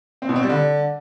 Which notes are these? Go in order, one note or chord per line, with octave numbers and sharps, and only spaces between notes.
C4
B2
C4
G3
D3